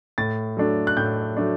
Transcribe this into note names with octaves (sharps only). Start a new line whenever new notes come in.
A2 A6
F#3 A3 D4
F#6
A2 G6
F#3 A3 D4